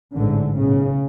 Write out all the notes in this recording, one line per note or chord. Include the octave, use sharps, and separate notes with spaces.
A1 G#2 D3
B1 A2 C#3